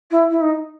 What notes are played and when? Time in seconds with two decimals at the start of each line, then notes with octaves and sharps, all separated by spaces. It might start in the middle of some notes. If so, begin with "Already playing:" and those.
0.11 E4
0.30 E4
0.41 D#4